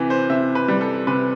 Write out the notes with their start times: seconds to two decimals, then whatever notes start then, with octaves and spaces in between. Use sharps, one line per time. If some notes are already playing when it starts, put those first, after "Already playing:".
Already playing: C3 E3 B4
0.10 C5
0.30 C3 E5
0.55 B4
0.68 G3
0.81 A4
1.07 C3 B4